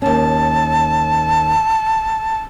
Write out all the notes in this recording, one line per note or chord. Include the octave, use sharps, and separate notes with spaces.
D#2 C#4 A5